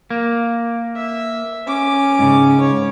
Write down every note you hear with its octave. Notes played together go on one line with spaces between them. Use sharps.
A#3
E5
C#4 D6
G#2 C#3
C#5